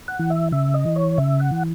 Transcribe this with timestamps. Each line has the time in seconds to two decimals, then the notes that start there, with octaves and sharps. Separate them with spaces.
0.08 F#5
0.19 E3
0.30 E5
0.52 C#3 E5
0.74 D#5
0.85 E3
0.96 C#5
1.18 C#3 E5
1.40 F#5
1.51 E3